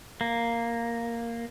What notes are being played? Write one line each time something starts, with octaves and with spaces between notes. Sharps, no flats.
A#3